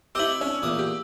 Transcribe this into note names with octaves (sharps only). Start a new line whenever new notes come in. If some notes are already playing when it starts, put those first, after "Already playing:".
C4 E4 G4 D#5 E6 F#7
C#4 D4
E2 A#2 D#6
G4